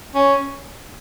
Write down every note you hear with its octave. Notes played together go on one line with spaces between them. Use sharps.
C#4